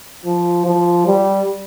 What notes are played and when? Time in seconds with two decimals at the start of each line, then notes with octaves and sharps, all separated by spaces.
0.26 F3
0.66 F3
1.06 G3